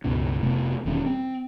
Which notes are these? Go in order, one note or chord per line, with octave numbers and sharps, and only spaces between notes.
C#2 G2 B2 C#4
F1 C3 A3 B3
E1 D#3 G3 C#4
C4